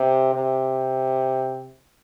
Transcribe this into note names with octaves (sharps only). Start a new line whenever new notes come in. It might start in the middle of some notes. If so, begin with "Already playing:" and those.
Already playing: C3
C3